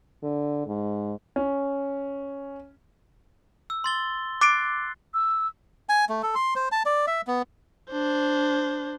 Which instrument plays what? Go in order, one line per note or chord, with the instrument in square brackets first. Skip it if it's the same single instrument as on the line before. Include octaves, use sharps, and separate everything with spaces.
[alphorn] D3
G#2
[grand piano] C#4
[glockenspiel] E6
C6 A6 G7
[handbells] D6 D7 [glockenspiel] F#6 A6 C7
[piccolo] E6
[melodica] G#5
A3
A4
C6
C5
A5
D5
E5
B3
[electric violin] D4 C5